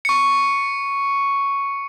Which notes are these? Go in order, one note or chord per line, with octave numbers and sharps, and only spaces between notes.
C#6 C#7